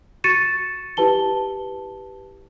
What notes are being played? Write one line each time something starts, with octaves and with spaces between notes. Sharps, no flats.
F#4 C#6 A6 C#7 D#7 E7
E4 G4 B4 A5 G7